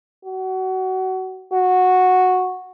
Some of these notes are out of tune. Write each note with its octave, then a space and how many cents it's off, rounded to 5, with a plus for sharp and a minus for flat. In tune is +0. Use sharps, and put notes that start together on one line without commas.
F#4 +25
F#4 -10